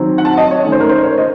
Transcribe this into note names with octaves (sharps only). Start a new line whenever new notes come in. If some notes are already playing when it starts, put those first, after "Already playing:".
Already playing: D#3 F#3 C4
F#5
A5
D#5
C#5
D#3 A3 C#4 C#5
C5
A#4
C5
C#5
D#5